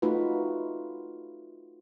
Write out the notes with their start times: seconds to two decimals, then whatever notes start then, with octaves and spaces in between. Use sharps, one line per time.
0.02 A3 D#4 F4 F#4 B4